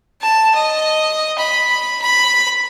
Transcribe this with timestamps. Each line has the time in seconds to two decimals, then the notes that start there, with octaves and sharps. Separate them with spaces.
0.21 A5
0.54 D#5
1.38 B5
2.01 B5